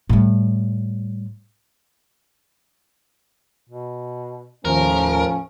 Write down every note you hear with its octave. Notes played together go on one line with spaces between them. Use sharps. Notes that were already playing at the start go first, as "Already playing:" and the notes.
A2 G3
B2
D#2 A2 F3 C#4 A#4